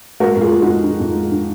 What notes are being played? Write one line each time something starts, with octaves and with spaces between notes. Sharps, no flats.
G#3 F#4 A#4
F2 F4 G#4
G#3
D#4 F#4
F2
D#3
F2
G#3
D#3